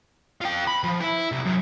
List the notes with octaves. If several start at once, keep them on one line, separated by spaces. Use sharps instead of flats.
F4 G5
B5
F3
E4
C2
F#2